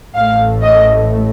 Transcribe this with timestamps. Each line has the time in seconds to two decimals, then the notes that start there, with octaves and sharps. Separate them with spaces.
0.15 A1 A2 A3 F5
0.64 D#5